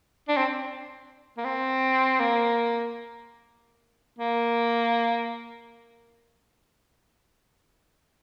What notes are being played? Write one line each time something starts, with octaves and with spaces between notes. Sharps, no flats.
D4
C4
A#3
C4
A#3
A#3